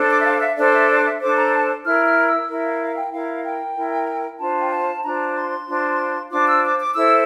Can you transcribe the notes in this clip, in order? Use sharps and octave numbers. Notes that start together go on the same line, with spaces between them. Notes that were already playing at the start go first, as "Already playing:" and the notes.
Already playing: D4 A4 C5
D6
E5
F5
E5
D4 A4 C5 D5
E5
D5
E5
D4 A4 C5 D6
A#5
A5
E4 A#4 F6
F6
E6
E4 A#4
F5
F5
G5
E4 A#4 F5
G5
E4 A#4
D4 F4 C5 A5
G5
A5
D4 F4 C5 A#5
C6
D4 F4 C5
D4 F4 C5 D6
E6
D6
D6
E4 A4 C5 E6